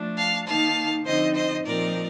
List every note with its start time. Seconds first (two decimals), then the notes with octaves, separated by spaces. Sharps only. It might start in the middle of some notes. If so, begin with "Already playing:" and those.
Already playing: F3 A3 D4
0.17 F5 A5
0.46 D#3 A#3 D#4 F5 A5
1.05 D3 F3 C4 D#4 C5 D#5
1.35 C5 D#5
1.65 A#2 F3 C4 D#4 A#4 D5